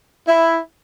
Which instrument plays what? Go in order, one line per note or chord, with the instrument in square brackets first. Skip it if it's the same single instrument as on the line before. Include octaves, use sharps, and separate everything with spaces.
[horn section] E4